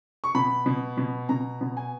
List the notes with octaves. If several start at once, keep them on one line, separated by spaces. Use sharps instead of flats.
C#6
B2 B5
B2
B2
B2 A#5
B2
G#5